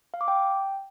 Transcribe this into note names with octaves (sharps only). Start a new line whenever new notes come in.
F5
D6
G5